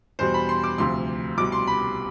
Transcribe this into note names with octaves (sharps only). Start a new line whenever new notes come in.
E2 B2 G3 C5
B5
C6
D6
D2 C3 F3 C6
C2 B2 G3 D6
C6
B5